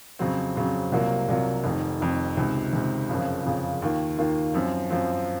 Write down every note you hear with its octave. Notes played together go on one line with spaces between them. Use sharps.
F2 C#3 F#3 C4
F2 C#3 F#3 C4
C2 C3 F#3 A#3 F4
C2 C3 F#3 A#3 F4
F1 F2 D#3
F1 F2 D#3
C#2 C3 D#3
C#2 C3 D#3
F#1 F2 C#3 F3
F#1 F2 C#3 F3
D#2 D#3 A#3 F4
D#2 D#3 A#3 F4
F#2 F3 C4
F#2 F3 C4